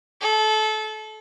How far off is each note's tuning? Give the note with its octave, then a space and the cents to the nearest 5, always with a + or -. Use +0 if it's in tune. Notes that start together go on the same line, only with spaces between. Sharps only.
A4 -25